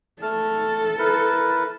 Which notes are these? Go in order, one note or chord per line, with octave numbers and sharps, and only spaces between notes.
A3 A4 A5 F6
E4 A#4 B4